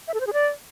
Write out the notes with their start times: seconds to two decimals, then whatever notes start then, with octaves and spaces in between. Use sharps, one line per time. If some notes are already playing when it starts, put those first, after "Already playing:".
0.08 E5
0.14 A4
0.20 C5
0.27 G#4
0.33 D5